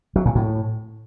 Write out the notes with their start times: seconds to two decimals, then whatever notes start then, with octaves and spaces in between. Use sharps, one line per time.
0.16 F#3
0.26 A#2
0.35 A2